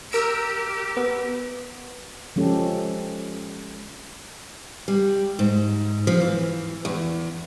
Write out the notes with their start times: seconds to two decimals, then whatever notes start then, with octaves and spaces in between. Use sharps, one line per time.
0.12 G4 A#4 E6 D7
0.97 B3
2.36 F3 G#3 C#4 G4 A4
4.88 G3
5.39 G#2
6.07 F3
6.21 E3
6.85 E2